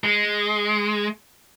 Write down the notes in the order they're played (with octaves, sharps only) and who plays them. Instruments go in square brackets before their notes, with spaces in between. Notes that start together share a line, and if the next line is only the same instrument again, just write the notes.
[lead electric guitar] G#3